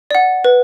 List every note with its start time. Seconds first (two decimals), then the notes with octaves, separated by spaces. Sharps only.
0.11 D5 F#5
0.45 B4